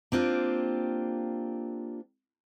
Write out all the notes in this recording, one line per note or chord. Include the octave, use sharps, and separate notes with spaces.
A#3 C4 D4 F4 G4